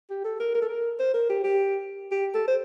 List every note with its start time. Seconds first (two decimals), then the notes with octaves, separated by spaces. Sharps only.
0.10 G4
0.24 A4
0.40 A#4
0.55 A#4
0.62 A4
0.69 A#4
0.99 C5
1.14 A#4
1.29 G4
1.44 G4
2.12 G4
2.34 A4
2.48 C5